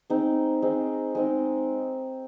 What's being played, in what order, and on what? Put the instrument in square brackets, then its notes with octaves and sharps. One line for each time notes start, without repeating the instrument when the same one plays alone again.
[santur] G#3 C4 D#4
G#3 C4 D#4
G#3 C4 D#4